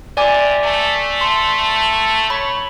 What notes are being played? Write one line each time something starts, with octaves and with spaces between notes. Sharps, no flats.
C3 D5 G#5 D6
A3
C6
C#5 B5